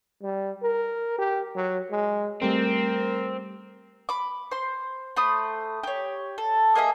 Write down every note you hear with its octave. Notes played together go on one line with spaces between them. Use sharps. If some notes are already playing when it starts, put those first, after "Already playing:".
G3
A#4
G4
F#3
G#3
G3 A3 C4 A#4
B5 D6
C5 C6
A3 C5 B5 D#6
G4 C#5
A4
A#3 G#4 D#5 E5